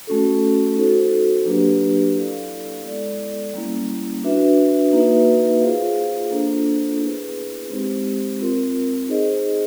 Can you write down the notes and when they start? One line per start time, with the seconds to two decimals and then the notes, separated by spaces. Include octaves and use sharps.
0.07 A3 C#4 F#4 A4
0.76 D#4 F#4 A4 C5
1.45 F#3 A#3 D4 G4 B4
2.15 E4 A4 D5 F5
2.84 G#3 B3 E4 A4 D5
3.53 G3 A#3 C#4 E4
4.23 D4 F#4 B4 E5
4.93 A#3 D#4 F#4 B4 E5
5.62 F4 G#4 C5 F5
6.31 A#3 D4 F4 A4 C5
7.00 B3 E4 G#4 B4
7.70 G#3 C4 D#4 G4 C5
8.39 C4 F4 A#4
9.08 D#4 G#4 C5 D#5